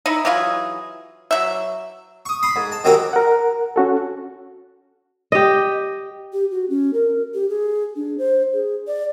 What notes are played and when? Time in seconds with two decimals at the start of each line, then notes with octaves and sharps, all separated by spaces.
0.06 D#4 E4
0.25 E3 F#3 F4 G#4
1.31 F#3 E5
2.26 C#6 D#6
2.43 B5 C6 D#6
2.56 G#2
2.72 A5
2.84 D#3 F#3 C4 C#4 G4 A#4
3.13 A#4 F#5
3.76 C#4 F#4 A4
5.32 G4 D#5
6.33 G4
6.51 F#4
6.70 C#4
6.93 A#4
7.34 G4
7.49 G#4
7.96 D4
8.18 C5
8.53 G#4
8.87 D5